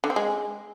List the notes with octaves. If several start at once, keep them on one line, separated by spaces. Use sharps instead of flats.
D3
C4
G#3